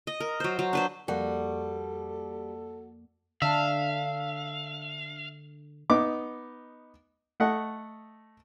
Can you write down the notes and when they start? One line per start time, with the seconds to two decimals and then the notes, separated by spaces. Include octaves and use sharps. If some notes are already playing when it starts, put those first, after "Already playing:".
0.07 D#5
0.20 A#4
0.40 F#3 C5
0.59 F#3
0.73 D4 B4 C5
1.08 F2 G3 A#3 F#4 A4
3.42 D3 D4 E5 F5
5.90 B3 D#4 D6
7.40 A3 D#5 F#5